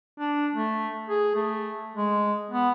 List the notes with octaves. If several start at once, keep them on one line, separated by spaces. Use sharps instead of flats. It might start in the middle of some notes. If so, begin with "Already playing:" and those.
D4
A3
G#4
A3
G#3
B3